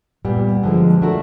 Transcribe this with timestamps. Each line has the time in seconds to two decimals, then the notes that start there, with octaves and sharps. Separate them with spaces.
0.25 A#2 G3 B3
0.63 D3 F3 G#3
1.02 A3 D4 F#4 A#4